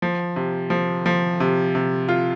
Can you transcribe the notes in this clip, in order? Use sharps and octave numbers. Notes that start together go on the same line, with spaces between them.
F3
C3
F3
F3
C3
C3
F4